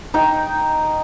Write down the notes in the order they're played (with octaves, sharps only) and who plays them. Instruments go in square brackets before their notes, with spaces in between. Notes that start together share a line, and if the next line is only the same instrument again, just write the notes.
[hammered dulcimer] D#4 G5